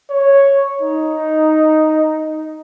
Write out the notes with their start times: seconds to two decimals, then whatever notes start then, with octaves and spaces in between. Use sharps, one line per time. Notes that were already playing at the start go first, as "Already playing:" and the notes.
0.10 C#5
0.81 D#4